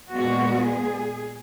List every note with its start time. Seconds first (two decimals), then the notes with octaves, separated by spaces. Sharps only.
0.13 A#2 G#3 B3 F#4
0.65 G#4